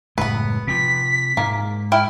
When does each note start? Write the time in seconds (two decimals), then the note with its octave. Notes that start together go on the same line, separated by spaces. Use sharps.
0.18 F#1 A2 G#3 B3 B4
0.67 C3 F3 B6
1.37 G#2 G#3 A#3
1.92 E4 G5 F6